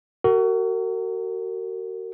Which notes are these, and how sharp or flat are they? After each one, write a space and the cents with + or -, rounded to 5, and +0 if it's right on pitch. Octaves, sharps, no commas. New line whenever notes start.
F#4 +30 A#4 -35